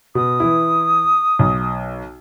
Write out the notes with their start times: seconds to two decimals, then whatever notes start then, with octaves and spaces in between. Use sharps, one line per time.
0.15 B2 D#6
0.40 E3 E4
1.39 B1